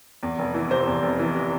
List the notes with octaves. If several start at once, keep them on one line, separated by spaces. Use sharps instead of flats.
E2
F1
E3
C3 C5
E2
F1
E3
C3